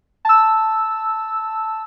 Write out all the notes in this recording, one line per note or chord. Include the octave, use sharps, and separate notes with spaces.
A5 E6